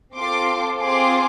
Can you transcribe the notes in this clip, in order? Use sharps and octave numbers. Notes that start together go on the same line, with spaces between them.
C4 F4 A4 C6 D6
C4 F4 G#4 C6 D6